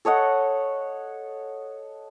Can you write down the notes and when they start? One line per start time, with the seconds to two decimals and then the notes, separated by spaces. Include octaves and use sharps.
0.05 A4 C#5 D#5 F#5